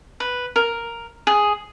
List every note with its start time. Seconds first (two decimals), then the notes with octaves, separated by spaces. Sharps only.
0.20 B4
0.56 A#4
1.27 G#4